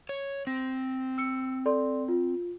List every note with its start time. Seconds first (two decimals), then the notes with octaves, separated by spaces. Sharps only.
0.09 C#5
0.47 C4 A#6
1.18 E6 C#7
1.66 A4 D5 C6
2.08 F4